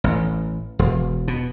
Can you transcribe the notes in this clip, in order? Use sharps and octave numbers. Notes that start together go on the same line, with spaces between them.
A1
E1
B2